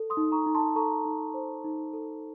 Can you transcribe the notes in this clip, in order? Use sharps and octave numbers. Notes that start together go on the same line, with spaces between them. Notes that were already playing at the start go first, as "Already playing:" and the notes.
Already playing: A4
C6 D#6
D#4
A#5 C#6
D#4
A5 C6
A4 A#5 C#6
D#4
C5
D#4
A4